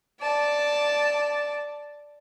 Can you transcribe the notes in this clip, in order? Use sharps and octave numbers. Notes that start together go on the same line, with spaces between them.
D5 A5